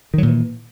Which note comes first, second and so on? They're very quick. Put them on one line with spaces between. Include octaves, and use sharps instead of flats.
D#3 F#3 A#2 E3